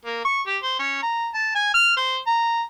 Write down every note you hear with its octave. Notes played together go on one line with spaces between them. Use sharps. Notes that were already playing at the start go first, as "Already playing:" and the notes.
A#3
C#6
G4
C5
C#4
A#5
A5
G#5
F6
C5
A#5